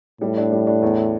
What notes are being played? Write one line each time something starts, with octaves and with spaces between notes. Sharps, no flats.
A2 G3
D4
G3
D4
E2